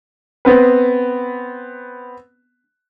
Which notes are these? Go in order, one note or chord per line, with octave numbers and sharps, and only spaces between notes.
B3 C4 B4